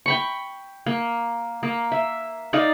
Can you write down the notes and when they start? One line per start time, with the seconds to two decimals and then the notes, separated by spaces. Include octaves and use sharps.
0.06 G5 B5 C#6
0.86 A#3
1.63 A#3
1.92 E5
2.53 D#4 D5 D#5 F5